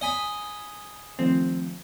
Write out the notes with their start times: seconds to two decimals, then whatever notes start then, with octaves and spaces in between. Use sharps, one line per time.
0.01 D#5 G#5 B5
1.19 D#3 F3 A3 C4